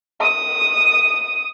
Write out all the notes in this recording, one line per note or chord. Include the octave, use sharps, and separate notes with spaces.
D#6